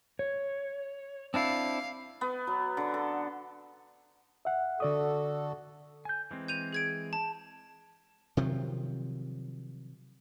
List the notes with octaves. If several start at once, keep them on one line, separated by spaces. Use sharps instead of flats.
C#5
C4 D4 E4 F5
B3
F#3
D3
A4
E5 F#5
D3 F#4 A4 D5 D#6
G#5 G6
E3 G#3 C4
G6 D#7 F7
G#4 G#6 D7
A5
C3 D#3 F3 F#3